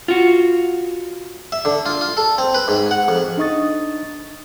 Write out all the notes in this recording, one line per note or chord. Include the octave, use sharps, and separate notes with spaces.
F4 F#4
E5
D3
F4
F4
A4
C4
B4
G#2
F#5
F2
D4 D#4 D#5 C#6 D#6 A6